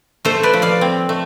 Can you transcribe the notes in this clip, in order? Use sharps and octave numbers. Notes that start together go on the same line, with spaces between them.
A3 A4 C5
B4 D5
F3
D5 F5
C4
A3